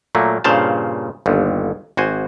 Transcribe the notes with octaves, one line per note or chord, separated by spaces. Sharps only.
A#2 F#3 A3 A#3
G2 A#2 C#3 C5 F5 A5
G1 D#2
G#1 F#4 C5 G#5